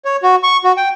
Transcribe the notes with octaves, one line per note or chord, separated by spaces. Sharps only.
C#5
F#4
C#6
F#4
G5